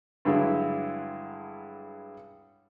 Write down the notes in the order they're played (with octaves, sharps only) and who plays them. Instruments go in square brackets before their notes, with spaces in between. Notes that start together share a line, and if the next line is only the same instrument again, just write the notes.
[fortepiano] G2 D3 F#3 G#3 E4